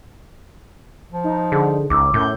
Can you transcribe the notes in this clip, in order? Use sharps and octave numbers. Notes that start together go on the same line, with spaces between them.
F3
D#4
D3 G#4
C#2 D#4 D6 E6
F#2 A2 G6